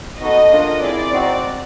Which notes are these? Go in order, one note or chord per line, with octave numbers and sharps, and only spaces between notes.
B3 D#4 F#4 A4 D#5
A#3 D4 F4 A4
C4 E4 G#4 D5
C4 D#4 F#4